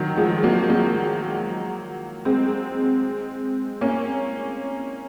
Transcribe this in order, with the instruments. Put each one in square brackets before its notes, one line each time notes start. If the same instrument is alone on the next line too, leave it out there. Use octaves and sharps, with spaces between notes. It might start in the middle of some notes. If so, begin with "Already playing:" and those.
Already playing: [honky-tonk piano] D#3 F#3
F3 G#3
F#3 A#3
F#3 A#3
G#3 C4
A#3 C#4